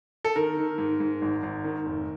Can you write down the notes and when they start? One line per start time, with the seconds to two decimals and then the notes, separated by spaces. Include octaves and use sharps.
0.25 A4
0.36 D#3 A#4
0.57 D#3
0.78 G#2
1.00 G#2
1.22 G#1
1.43 G#1
1.65 D#3
1.86 F1